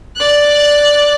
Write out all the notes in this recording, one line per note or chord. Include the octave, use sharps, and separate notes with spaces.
D5 F#6